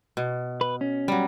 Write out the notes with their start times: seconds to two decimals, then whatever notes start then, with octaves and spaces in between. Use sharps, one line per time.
0.17 B2
0.61 B4
0.81 C#4
1.08 F#3 G3